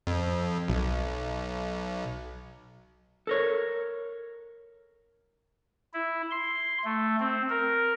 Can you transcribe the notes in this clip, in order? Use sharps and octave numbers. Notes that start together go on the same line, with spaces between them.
F2
B1
A4 A#4 C#5
E4
C6
A3
C4
A#4